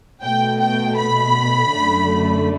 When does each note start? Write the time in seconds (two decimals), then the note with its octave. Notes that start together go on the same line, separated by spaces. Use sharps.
0.22 B2 A3 G5
0.59 G5
0.97 B5
1.71 F#2 D3 A3